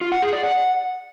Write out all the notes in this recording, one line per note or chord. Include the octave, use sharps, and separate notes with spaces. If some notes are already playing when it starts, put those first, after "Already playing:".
F4
F#5
G#4
D5
F#5